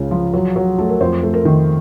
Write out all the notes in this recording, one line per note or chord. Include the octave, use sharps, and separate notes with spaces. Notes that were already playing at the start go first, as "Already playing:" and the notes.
Already playing: C#2 C#3
F3
F#3
F#3
A3 A4
A#4
F2 C5
A3
A#4
D#3